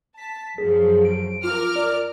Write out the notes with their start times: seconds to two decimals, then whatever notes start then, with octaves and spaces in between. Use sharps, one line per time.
0.17 A5 B6
0.58 F#2 F3 F#3 G#4
1.05 D7
1.44 F4 A#4 D6 F6
1.76 D5